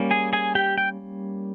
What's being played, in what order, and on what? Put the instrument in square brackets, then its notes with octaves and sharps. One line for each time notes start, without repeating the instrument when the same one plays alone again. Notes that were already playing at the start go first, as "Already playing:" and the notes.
Already playing: [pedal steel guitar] G3 A#3 C#4
G#4 G#5
G#4 G#5
G4 G5
G5